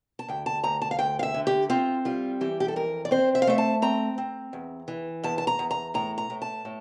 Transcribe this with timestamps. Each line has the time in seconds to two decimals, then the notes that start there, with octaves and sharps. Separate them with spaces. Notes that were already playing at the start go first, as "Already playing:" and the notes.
0.19 A5
0.28 D2 G5
0.46 A5
0.64 D2 A#5
0.82 A5
0.91 F5
0.99 D2 G5
1.19 F5
1.23 E5
1.34 D3
1.47 G4
1.70 C4 F4
2.05 G3 F4
2.41 E3 G4
2.60 G4
2.68 A4
2.76 F2 A#4
3.05 D5
3.11 C4 C5
3.35 E5
3.42 F5
3.47 A3 E5
3.58 A5
3.82 C4 A#5
4.18 C4
4.53 E2
4.88 E3
5.23 E2 A5
5.38 A5
5.47 A#5
5.59 E2
5.71 A#5
5.94 A2 A#5
6.18 A#5
6.30 A2
6.42 A5
6.65 A2